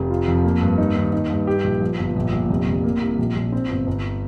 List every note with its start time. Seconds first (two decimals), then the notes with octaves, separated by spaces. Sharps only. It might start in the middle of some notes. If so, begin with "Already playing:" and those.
Already playing: F1
0.10 F4
0.28 F2
0.44 A#3
0.61 G2
0.78 D#4
0.95 D#2
1.13 D#4
1.30 G2
1.47 G4
1.64 A#1
1.81 F3
1.99 G1
2.16 A#1
2.32 A#1
2.50 F1
2.67 F1
2.84 A#3
3.01 C2
3.19 A#1
3.36 A#1
3.52 C4
3.70 G1
3.87 G1